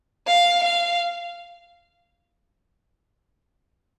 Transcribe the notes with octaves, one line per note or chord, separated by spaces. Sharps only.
F5
F5